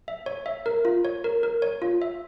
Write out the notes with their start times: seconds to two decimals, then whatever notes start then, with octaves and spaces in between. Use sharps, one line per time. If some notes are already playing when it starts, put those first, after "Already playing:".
0.08 E5
0.26 C#5
0.46 E5
0.66 A#4
0.85 F4
1.05 C#5
1.24 A#4
1.43 A#4
1.62 C#5
1.82 F4
2.02 E5